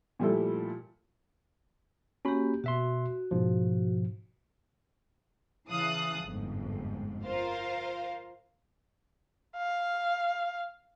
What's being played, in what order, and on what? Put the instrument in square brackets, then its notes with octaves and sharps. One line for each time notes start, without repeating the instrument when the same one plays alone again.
[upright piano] A#2 F3 G3 A3 E4 A4
[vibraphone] A#3 G4 [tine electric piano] C#4 F#4 B5
[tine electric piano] B2 E5 C6 [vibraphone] F#4
[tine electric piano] G#2 B2 F3
[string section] C#3 E3 F5 A5 D#6 F#6
G1 F2 G#2
F4 A#4 C5 F5
[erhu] F5